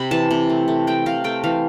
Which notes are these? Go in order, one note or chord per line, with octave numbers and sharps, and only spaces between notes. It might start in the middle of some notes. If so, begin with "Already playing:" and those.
Already playing: C3 B5
E3 A5
C3
A3
A3
A3 G5
C3 F5
A3 G5
E3 F5